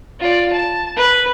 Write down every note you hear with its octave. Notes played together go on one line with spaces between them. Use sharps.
F4 D5
A5
B4